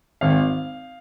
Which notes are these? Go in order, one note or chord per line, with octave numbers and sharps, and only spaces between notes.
G#1 F5